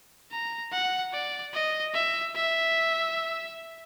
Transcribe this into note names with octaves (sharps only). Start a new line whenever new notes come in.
A#5
F#5
D5
D#5
E5
E5